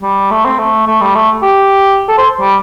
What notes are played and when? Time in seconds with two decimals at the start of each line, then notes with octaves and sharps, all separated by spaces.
0.02 G3
0.31 A3
0.45 C4
0.59 A3
0.87 A3
1.01 G3
1.15 A3
1.43 G4
2.09 A4
2.18 C5
2.41 G3